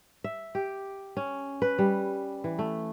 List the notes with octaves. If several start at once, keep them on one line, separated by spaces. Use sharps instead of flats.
E5
G4
C#4
B4
G3
E3
A3